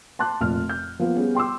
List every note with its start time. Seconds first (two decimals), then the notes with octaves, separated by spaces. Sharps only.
0.19 A5 C6 D6 F#6
0.41 F1 A#2 F6
0.69 G6
0.99 F3 A#3 B3
1.15 G3 B3 C#4 G#4
1.35 G5 C6 D6 E6